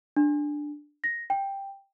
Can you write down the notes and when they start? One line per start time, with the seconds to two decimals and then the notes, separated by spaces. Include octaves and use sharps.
0.16 D4
1.04 A#6
1.30 G5